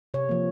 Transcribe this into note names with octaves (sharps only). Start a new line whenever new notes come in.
C3 C#5
F3 A#3